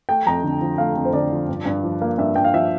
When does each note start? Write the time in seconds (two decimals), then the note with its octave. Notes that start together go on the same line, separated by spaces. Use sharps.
0.09 A3 G5
0.27 F2 A#5
0.43 D3
0.61 F3
0.78 A3 F5
0.96 F2
1.05 C5
1.13 D3 D5
1.31 F3
1.49 G2
1.65 G2
1.83 F3
2.02 A#3
2.18 G2 E5
2.36 G2 G5
2.44 F5
2.54 F3 E5